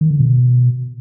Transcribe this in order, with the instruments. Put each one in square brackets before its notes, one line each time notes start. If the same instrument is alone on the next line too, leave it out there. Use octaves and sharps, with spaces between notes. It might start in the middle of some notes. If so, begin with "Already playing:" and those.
[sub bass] D#3
D3
B2